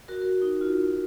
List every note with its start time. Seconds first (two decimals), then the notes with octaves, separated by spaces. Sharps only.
0.08 F#4 A#4
0.21 F#4 A#4
0.42 D#4
0.61 F4